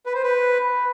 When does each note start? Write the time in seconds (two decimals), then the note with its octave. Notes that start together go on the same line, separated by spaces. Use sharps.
0.06 B4
0.15 C5
0.23 B4